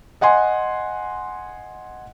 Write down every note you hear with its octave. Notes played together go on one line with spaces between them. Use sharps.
D#5 F#5 G#5 C6